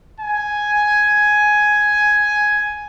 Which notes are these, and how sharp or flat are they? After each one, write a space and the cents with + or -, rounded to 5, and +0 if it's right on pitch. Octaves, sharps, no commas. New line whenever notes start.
G#5 +5